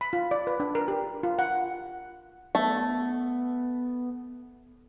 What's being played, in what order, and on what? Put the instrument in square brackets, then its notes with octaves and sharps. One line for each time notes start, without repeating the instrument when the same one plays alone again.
[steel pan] B5
F4
D5
B4
D4
A#4
G4
F4
F#5
[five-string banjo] A3 [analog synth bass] B3